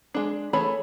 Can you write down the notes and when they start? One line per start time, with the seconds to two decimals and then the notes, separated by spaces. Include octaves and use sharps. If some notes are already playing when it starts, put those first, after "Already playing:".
0.14 G#3 D4
0.53 E3 A3 G#4 C#5 B5